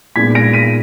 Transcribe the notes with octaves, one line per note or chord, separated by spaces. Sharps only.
A#2 G#3 B3 D#4 G#6 B6
A#6 D7
B6 D#7